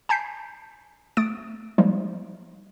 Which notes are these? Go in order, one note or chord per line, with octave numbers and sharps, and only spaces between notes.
G#5 A5 G6 B6 C7
A3 D#6 A6 D7
F3 G3 G#3 A#3 D#4